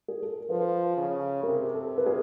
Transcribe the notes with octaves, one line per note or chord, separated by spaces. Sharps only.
G#4
A4
A#4
F3 A4 B4
C#3
C3 G#4 A#4
A4
B4
G#4 A#4